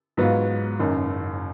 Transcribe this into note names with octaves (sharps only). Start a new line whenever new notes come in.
G#2 F#3 B3 F4
F#1 F#2 D#3